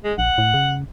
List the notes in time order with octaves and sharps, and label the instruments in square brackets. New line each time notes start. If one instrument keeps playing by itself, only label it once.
[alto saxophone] G#3
[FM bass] A#1 [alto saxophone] F#5
[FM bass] A2
C#3